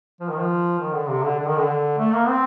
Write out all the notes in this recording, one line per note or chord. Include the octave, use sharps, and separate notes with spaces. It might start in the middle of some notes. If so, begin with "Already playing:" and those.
F3
D#3
F3
D#3
D3
C3
D3
D3
D#3
D3
A3
A#3
C4